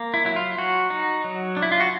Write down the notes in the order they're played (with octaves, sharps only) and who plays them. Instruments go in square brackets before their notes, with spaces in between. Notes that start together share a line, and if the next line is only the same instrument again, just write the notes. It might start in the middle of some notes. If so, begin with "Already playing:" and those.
Already playing: [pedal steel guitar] A#3
E4
F#3 E4
F4
F#3 F#4
D#4
F#3
D4
E4
F4
F#4